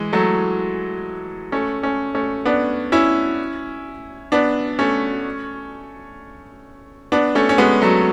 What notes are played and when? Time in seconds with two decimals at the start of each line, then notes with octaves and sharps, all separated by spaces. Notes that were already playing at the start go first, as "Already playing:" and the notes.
Already playing: E3 G#3
0.13 F#3 A3
1.52 A3 C#4
1.83 A3 C#4
2.15 A3 C#4
2.46 B3 D4
2.92 C#4 E4
4.32 B3 D4
4.79 A3 C#4
7.12 B3 D4
7.35 A3 C#4
7.49 C#4
7.58 G#3 B3
7.82 F#3 A3